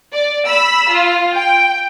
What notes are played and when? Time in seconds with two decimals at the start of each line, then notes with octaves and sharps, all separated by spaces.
0.12 D5
0.46 B5 E6
0.90 F4
1.34 G5